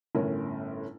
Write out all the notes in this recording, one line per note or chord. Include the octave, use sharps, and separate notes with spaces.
G1 A2 C#4 A#4